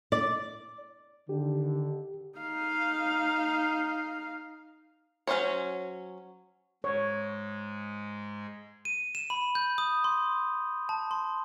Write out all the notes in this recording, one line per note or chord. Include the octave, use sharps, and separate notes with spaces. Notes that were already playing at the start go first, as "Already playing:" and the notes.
D5
D3 D#3 G4
D#4 F5
F#3 C#4 D#4 C5 C#5
G#2 G#3 C#5
D#7
E7
B5
G6
D#6
C6
A5
C6